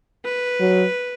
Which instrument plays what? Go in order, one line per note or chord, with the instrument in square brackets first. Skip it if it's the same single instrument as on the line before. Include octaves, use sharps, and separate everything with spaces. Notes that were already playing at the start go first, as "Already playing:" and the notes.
[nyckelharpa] B4
[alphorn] F#3